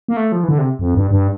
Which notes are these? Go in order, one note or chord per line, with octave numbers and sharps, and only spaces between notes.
A#3
A3
F3
E3
D3
C3
F2
G2
G2